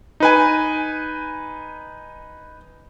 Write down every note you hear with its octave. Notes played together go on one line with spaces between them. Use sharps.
D#4 B4 G#5